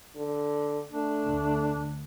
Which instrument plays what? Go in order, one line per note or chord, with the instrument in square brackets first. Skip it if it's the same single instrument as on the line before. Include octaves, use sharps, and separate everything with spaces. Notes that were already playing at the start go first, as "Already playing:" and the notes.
[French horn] D3
[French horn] A3 [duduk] D4
[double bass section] D2